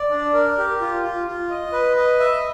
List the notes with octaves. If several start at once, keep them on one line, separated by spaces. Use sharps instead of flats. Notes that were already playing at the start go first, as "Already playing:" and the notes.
Already playing: D5
D4
A#4
G4
F4
F4
F4
D#5
B4
D#5
E5